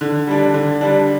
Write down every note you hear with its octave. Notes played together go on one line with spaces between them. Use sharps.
D3
G3 D4
D3
G3 D4